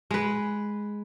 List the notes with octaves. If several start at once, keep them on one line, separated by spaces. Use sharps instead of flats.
G#3 B4